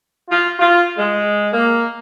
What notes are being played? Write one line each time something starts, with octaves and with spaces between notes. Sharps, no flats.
F4
F4
G#3
A#3